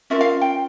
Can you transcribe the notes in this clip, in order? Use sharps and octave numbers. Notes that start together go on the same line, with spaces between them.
C#4 F4 A#4 E5
F5
G5